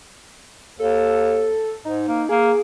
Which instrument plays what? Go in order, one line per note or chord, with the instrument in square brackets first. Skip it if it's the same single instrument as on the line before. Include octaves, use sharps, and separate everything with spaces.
[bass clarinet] D#2 [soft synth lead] A4
[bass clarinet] G#2 [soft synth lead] D#4
[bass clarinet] A#3
[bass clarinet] A#3 [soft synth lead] G#4